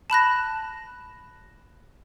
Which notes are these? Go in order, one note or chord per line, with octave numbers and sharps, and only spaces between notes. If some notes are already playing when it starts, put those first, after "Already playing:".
A5 B5 F#6 A#6